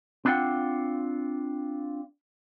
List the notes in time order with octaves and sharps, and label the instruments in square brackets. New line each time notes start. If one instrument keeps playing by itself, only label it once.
[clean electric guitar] C4 D4 E4 F4 F#5 G5